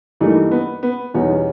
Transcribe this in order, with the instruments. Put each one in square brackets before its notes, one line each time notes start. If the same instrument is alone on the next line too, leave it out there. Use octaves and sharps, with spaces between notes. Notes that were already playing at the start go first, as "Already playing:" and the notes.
[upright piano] G2 E3 G3 A#3 D#4 [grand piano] A3
[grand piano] B3
B3
[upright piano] E2 B2 G3 B3 D#4 [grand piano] C#4